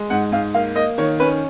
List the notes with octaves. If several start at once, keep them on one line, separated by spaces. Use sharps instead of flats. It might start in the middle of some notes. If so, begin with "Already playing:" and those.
Already playing: G#3
G#2 F#5
G#2 F5
A#3 F5
A#3 D#5
D#3 C#5
C#4 B4